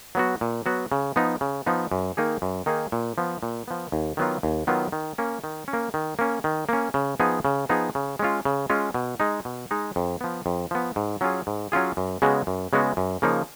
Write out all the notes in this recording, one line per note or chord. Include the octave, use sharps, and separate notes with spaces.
F#3 B3 F#4
A#2
F#3 B3 F#4
C#3
F3 B3 D#4
C#3
F3 B3 D#4
F#2
D#3 A#3 D#4 G#4
F#2
D#3 A#3 D#4 G#4
A#2
F3 B3
A#2
F3 B3
D#2
D#3 F#3 B3 F4
D#2
D#3 F#3 B3 F4
D#3
A#3 C#4
D#3
C#4
A#3
D#3
A#3 C#4
D#3
A#3 C#4
C#3
F3 B3 D#4 G#4
C#3
F3 B3 D#4 G#4
C#3
G#3 C#4 F4
C#3
G#3 C#4 F4
B2
G#3 D#4
B2
G#3 D#4
F2
F3 B3
F2
F3 B3
G#2
F#3 C#4 F4 G#4
G#2
F#3 C#4 F4 G#4
F#2
C#3 G#3 B3 F#4
F#2
C#3 G#3 B3 F#4
F#2
C#3 F3 A#3 D#4